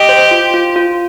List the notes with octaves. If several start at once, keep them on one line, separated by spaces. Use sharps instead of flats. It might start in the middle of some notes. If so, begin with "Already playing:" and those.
Already playing: G4 D#5
C5
F4
F4
F4